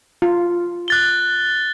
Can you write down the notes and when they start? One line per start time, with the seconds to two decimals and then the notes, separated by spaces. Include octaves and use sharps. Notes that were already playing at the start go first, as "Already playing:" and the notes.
0.22 F4
0.88 F#6 A6 G7